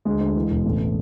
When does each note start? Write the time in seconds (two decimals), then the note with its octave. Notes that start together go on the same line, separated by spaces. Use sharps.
0.05 D2 G#3
0.20 D2
0.35 E3
0.51 E1
0.65 A1 A3